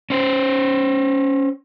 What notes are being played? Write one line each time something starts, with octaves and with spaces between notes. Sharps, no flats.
C#4 C5